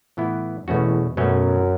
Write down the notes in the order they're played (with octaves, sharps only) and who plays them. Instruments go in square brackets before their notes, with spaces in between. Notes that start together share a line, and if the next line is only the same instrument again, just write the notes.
[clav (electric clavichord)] A2 E3 B3 E4
[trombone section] E2 [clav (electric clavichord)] B2 A3 C#4 F#4
[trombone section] F#2 [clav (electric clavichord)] B2 F#3 A3 C#4